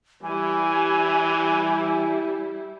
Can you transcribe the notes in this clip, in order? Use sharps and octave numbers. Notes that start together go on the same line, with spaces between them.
E3 G3 E4 G#5